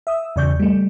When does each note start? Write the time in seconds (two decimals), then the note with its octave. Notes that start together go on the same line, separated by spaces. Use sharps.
0.07 E5 D#6 E6
0.36 E2 C#3 D5 C#6 G6
0.60 G3 A3